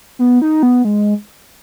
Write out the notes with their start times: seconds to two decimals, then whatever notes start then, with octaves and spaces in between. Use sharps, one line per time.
0.19 B3
0.42 D#4
0.63 B3
0.84 G#3